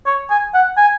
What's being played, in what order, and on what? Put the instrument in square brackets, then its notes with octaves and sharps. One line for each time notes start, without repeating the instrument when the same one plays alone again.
[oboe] C#5
G#5
F#5
G#5